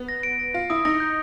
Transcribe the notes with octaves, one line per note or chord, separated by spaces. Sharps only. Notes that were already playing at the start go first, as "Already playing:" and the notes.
Already playing: B3
A#6
D7
A#6
F4 A#6
E4 D#6
D#4 A#6
G6